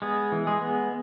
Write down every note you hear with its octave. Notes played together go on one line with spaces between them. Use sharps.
G#3 B3 G#4
E3
G#3 G#4
B3